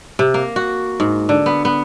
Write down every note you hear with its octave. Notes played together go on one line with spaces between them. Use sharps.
C3
A#3
F#4
G#2
D3
B3
B3